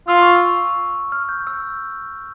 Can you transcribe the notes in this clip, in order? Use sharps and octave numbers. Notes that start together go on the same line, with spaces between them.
F4 E6
C#6
E6
F6
G6
E6